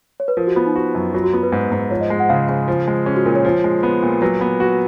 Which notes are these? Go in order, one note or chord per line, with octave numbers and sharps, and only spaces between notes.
C#5
B4
F3 A#4
F#4
B3 F4
D#4
F#4
F#2
F#3 F4
F#4
B3 F4
B4
G#2
G#2
F3 C#5
D#5
G#3
F#5
C#3 F5
C#3
F3
G#3
C#4 G#4
F#4
A#2 A#4
C#5
F3
G#3
B3
A#2
F#3 B4
B3
F#4